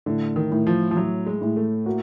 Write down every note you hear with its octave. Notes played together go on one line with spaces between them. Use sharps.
A2 D3
D#3
A2
F3
F3
A2 F#3
G#3
A2
A3
A#3 F#4